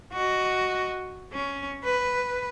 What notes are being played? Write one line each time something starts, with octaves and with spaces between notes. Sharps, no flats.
F#4 D#5
C#4
B4